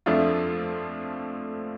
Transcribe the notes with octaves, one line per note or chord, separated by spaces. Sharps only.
F2 F3 A3 D4 F4